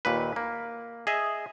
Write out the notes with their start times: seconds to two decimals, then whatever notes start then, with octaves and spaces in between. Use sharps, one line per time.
0.05 D#2 A#2 B4
0.36 A#3
1.07 G#4 D#5 E5